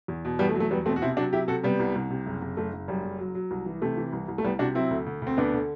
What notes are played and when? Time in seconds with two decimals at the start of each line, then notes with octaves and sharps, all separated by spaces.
0.08 E2
0.25 B2
0.39 E2 G3 B3
0.49 A3
0.55 F#3
0.60 A3
0.71 E2 G3 B3
0.86 B2 A3 C4
0.96 F#4
1.02 C3 C4 E4
1.17 F#3 D4 F#4
1.33 F#3 E4 G4
1.48 C3 F#4 A4
1.63 C3 G3 B3
1.79 C2
1.95 C2
2.11 C3
2.26 F#1
2.42 F#1
2.57 F#1 A3
2.73 F#1
2.88 F#2 G3
3.03 F#1
3.19 F#3
3.35 F#3
3.51 C2
3.66 E3
3.82 C3 A3
3.97 E3
4.13 C2
4.28 C2
4.38 A3
4.44 C2 G3 B3
4.59 C3 D4 F#4
4.75 F#3 C4 E4
4.91 D2
5.06 D2
5.22 D2 C4
5.37 D2 B3 D4
5.53 D3